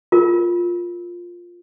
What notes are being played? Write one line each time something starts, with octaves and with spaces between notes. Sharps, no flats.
F4 A#4